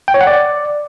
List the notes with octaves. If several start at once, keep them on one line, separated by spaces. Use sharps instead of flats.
G5
C#5
F#5
D5